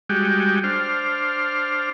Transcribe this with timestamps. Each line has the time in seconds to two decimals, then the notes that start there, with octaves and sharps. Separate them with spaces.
0.09 G3 G#3 F#4 G4
0.64 D4 C5 F6